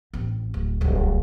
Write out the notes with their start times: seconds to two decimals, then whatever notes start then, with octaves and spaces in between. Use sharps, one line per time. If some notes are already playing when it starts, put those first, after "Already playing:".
0.13 A1 C4
0.54 D1
0.81 D1 C2